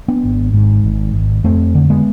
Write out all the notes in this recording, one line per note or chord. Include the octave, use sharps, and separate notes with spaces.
B3 D4
G#1
G#2
G#1
G#1
F2 A3 C4
D3
G#3 B3